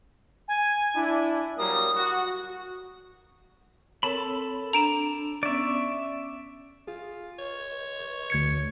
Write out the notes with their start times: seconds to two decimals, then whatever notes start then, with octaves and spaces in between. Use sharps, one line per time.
0.48 G#5
0.95 D4 E4
1.58 F#3 G3 A#3 D#6
1.96 F#4
4.03 C4 A4 A#4 C#5 A5 B5
4.73 D4 A#5 D7 E7
5.43 B3 C#4 D5 E5 C#6
6.87 F4 G#4
7.39 C#5
8.30 D2 G#6 C#7